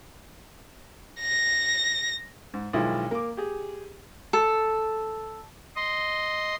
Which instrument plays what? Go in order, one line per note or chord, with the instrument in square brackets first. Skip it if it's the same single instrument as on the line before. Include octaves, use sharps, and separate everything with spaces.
[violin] A#6
[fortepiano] G#2
B1 D#3 F3 G#3 E4
A#3 D6
G4 G#4
[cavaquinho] A4
[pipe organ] D#5 C6